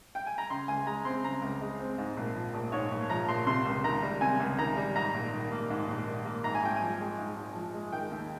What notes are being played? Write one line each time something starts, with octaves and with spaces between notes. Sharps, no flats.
G5
G#5
A#5
C#3 C6
C#2 G#5
G#3 A#5
C4 C6
C#3 A#5
C#2
G#3
C4
G#2
A#1
F3
A#1
G#2 C#5
A#1
F3 A#5
A#1 C6
C3 C6
C#2
D#3 A#5
G3
C3 G#5
C#2
D#3 A#5
G3
G#2 A#5
A#1
D#3
A#3
G#2
A#1
D#3
A#3
G#2 A#5
G#5
G#1 G5
G#5
F3
G#3
G#2
G#1
F3
G#3
D#3 G5
D#2